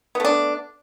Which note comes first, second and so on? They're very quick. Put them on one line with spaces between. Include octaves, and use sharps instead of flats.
B3 A3 D4